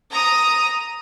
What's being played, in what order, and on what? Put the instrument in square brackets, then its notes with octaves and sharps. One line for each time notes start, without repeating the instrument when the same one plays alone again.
[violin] A#5 D#6